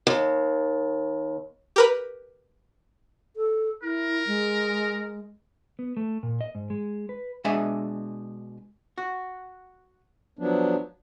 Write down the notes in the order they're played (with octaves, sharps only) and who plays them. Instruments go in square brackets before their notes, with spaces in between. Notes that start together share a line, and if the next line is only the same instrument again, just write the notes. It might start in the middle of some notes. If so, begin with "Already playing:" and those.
[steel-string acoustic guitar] D#2
[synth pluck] G4 A#4 B4
[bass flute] A4
[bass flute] E4 [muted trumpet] A#4
[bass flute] G#3
[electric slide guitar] B3
A3
A#2
D#5
G#2
G#3
B4
[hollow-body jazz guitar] B2 G#3 D4 E5 G#5
F#4
[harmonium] F3 F#3 B3 D4